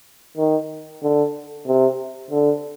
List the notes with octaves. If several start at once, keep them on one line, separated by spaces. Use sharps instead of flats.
D#3
D3
C3
D3